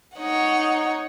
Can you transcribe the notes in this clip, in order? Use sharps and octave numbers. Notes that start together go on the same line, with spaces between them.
D#4 C#5 F#5